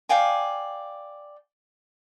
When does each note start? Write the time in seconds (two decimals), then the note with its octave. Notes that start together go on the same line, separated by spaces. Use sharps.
0.09 D5 F5 G5 G#5